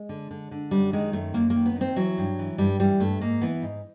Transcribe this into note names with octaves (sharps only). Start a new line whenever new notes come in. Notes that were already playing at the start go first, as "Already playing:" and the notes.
Already playing: G#3
D3
D3
D3
F#2 G3
D#3 G#3
F#2 A3
F#2 A#3
A#3
D#3
B3
D#3
C4
E3 F#3
G2
E3
G2 G3
E3 G3
G2 A3
G#2 A#3
E3 B3
G#2